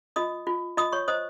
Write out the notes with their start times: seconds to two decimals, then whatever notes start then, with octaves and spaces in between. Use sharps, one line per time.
0.16 F4 D#5 D#6
0.47 F4
0.77 F4 D#5 D#6
0.92 C#5 C#6
1.08 C5 D#5 D#6